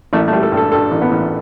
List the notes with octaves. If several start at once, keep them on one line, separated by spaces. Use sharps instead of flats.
A1 A3
A3
G3
A4
G2
A4
G2 A4
A1
B3
A1